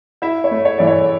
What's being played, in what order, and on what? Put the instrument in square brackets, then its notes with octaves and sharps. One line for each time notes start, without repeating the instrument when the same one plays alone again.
[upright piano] E4 E5
C#5
A3
C#5
E3 D5
C#5